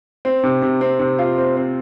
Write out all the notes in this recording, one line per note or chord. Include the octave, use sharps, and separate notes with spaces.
C4
C3
C3
C4
C3
F4
C4
C4